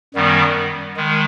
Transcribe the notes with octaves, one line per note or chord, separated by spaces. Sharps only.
F#2 D#3 G3 B3
D#3 G#3